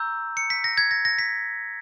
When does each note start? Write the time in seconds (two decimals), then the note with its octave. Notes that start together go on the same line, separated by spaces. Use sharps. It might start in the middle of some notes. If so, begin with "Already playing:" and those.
Already playing: A#5 C#6 E6 G6
0.37 C#7
0.50 B6
0.64 A#6
0.77 G#6
0.91 A#6
1.05 A#6
1.19 B6